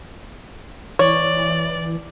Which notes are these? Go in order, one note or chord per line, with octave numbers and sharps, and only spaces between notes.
E3 C#5 D5